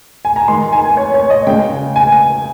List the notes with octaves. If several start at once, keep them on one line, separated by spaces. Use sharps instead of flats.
G#5
A#5
D#3 G#3 C6
G#5
G#5
C#5
C#5
D#5
C#3 G#3 G5
G#5